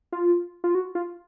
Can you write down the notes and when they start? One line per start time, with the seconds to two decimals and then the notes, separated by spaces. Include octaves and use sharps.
0.12 F4
0.64 F4
0.75 F#4
0.95 F4